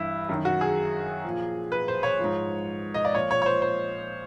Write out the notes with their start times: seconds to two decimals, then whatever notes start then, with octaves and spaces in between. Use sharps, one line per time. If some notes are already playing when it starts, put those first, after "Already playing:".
Already playing: G2 E3 E4
0.29 F#2 D#3
0.45 F#4
0.61 G#4
1.24 A#2 F3
1.72 B4
1.88 C5
2.03 C#5
2.19 G#2 F3
2.94 D#5
3.05 D5
3.14 A#2 F3 C#5
3.31 C#5
3.42 C#5
3.46 C5
3.62 C5